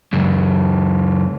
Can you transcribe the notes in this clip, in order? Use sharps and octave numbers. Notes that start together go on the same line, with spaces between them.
C#2 F#2